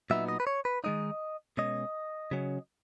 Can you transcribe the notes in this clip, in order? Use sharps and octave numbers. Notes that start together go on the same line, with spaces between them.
A#2 F#3 B3 D#4 E5
D#5
B4
C#5
B4
D#3 G#3 D#4 D#5
B2 G#3 C#4 D#5
C#3 F#3 C#4